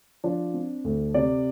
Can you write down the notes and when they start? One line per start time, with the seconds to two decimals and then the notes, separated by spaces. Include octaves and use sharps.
0.24 F3 D4
0.54 C4
0.84 D2
1.14 C3 D5